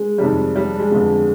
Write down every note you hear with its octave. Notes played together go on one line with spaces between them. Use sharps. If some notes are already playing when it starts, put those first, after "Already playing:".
Already playing: G#3
F2 C3 D#3 G3
G3
G#3
G1 F2 D3